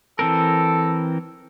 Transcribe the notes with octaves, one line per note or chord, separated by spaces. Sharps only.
E3 C4 A4 A#4